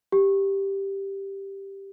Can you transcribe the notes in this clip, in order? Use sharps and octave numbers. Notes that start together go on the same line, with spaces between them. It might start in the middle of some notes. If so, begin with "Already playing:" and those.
G4